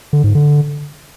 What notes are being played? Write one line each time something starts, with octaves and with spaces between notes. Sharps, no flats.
D3
G#2
D3